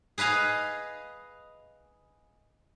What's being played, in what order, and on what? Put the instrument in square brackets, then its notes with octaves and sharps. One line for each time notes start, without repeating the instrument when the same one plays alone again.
[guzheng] G#4 B4 D#5 F5 G#5